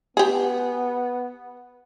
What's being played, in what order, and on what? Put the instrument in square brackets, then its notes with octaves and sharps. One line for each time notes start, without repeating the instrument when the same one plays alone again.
[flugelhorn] B3 [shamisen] G4 G#4